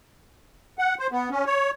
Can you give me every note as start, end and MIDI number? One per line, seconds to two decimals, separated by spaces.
0.79 0.95 78
0.99 1.07 72
1.12 1.29 59
1.31 1.44 61
1.46 1.71 73